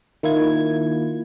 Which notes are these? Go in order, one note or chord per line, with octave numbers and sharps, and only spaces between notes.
D#3 A#3 E4 F4 G#6